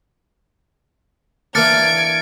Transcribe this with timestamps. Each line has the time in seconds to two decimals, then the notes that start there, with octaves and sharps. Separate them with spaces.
1.55 E3 A#3 D4 F6 G#6 A6 C#7 D7